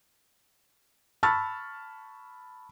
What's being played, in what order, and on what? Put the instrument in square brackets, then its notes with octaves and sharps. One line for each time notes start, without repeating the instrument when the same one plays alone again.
[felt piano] A5 B5 C#6 E6 F6 A6